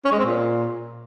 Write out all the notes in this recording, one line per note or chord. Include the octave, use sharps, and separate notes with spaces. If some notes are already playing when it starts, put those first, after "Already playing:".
C#4
G#3
C4
A#2